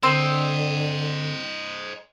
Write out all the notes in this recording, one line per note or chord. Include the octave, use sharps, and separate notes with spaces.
D3 C4 C5 D#5